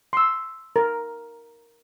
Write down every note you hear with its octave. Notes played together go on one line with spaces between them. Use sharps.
C6 E6
A#4